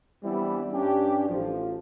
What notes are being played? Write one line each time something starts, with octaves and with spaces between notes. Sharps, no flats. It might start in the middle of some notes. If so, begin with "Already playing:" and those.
E3 G3 B3 C4 D4 E4
G2 C#4 D4 G4
A1 F3